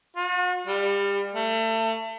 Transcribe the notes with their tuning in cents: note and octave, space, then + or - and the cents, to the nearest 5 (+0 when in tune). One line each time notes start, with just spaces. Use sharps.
F#4 -45
G3 +30
A3 +30